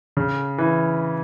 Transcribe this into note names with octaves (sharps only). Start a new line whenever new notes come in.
C#3
E3